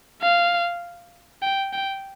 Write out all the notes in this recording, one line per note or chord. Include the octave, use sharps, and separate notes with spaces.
F5
G5
G5